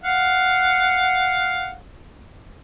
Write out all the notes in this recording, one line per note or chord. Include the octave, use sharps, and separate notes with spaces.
F5 F#5